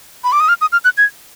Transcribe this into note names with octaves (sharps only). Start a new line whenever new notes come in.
B5
D6
D#6
F6
D#6
F6
F#6
G#6